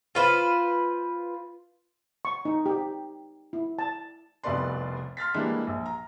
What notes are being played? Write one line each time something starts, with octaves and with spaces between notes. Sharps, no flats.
F4 B4 C5
C#6
D#4
G4
E4
A5
F1 C2 B2 B4 D5 C6
C6 F6 A6 B6
E3 G3 G#3 A#3 D4 E4
A#1
A#5